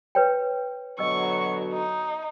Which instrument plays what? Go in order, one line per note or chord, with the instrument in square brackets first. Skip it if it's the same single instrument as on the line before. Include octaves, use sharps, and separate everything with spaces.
[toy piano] B4 C#5 G5
[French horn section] B2 D3 F#3 [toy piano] D#5 E6 [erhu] C#6
[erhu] D#4